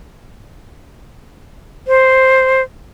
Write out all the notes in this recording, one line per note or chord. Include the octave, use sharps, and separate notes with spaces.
C5